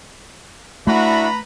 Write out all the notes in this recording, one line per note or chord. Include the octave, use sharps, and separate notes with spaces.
A3 D4 E4 F#4 B4 A#5 B5